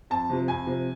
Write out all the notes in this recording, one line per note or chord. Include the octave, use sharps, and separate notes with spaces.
F2 A5
C3 F3
F2 G#5
C3 F3